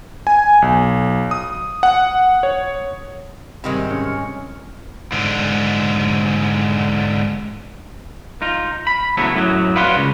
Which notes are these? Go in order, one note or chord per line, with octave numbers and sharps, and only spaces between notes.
G#5
B1
D#6
F#5
C#5
G#2 C3 D#3 G3 G#3 C4
C#4
G#2 D3
D#4 F4
B5
A2 C#3 F#3 A3 B3 E4
F#2 A2 F#3
B4 D5 F5 F#5 B5 C6
C#2 C#3